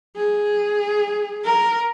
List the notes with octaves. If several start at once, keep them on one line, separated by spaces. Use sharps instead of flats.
G#4
A#4